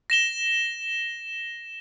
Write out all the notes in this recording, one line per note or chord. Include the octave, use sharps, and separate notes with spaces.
A#6 E7 G7